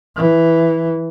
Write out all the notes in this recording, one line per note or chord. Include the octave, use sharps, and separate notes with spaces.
E3